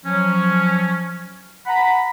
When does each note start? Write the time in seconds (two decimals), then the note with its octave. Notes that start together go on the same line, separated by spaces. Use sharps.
0.05 F3 F#3 C#4
1.67 F#5 A#5 B5